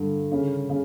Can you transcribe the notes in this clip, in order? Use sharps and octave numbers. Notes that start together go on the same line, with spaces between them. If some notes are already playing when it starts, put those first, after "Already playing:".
Already playing: G2 D3
C#3
C#3